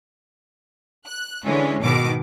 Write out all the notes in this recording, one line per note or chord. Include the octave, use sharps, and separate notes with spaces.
F#6
D3 E3 G#3 C#4
G#2 B2 D#3 D6